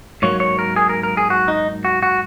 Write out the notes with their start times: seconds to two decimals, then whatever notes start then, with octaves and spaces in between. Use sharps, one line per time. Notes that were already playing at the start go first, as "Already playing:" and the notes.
0.22 G#2 F#3 A#3 C#5
0.40 C#5
0.59 A#4
0.76 G#4
0.89 A#4
1.03 A#4
1.17 G#4
1.30 F#4
1.48 D#4
1.85 F#4
2.03 F#4